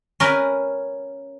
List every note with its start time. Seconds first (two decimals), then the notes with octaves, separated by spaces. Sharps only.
0.20 C#4 A#4 B4